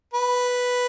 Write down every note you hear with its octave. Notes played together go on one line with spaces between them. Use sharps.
B4